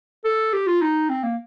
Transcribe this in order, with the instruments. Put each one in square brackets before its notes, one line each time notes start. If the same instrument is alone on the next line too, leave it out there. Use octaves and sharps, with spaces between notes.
[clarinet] A4
G4
F4
D#4
C4
A#3